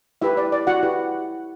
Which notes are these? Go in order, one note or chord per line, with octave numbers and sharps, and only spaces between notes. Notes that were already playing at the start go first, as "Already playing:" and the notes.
E4 G4 B4 E5
D5
D5
F#4 F#5
E4 G4 B4